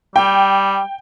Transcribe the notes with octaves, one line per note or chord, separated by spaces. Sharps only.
G3 G5